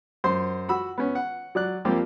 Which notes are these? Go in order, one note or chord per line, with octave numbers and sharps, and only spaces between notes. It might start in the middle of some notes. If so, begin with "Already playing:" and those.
F#2 C5 C6
F#4 B5 E6
B3 C#4
F#5
F#3 D5 F#6
F3 G3 A#3 C4 F4 G4